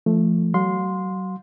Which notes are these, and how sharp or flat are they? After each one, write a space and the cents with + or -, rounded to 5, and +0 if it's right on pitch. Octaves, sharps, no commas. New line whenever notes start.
F3 -25 A3 +0
F#3 +30 F5 +40 C6 -5